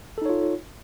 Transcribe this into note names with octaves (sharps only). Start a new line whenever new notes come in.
D#4 F4 A4 C#5